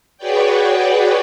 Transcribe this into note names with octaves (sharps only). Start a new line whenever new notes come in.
F#4 G#4 B4 C#5 D5 G5